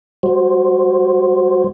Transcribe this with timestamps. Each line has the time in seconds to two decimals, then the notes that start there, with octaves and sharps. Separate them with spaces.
0.23 G3 F#4 C5